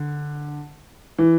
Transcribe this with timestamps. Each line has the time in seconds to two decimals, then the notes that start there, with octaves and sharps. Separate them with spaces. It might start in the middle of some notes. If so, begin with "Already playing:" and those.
Already playing: D3
1.19 E3